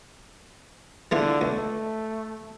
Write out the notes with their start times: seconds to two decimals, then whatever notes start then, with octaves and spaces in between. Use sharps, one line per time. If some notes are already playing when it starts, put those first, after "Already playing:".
1.11 D3 E3 F4 G#4
1.41 C#2 A3